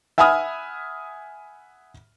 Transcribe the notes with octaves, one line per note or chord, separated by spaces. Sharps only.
E5 F#5 G#5 B5 D#6 F6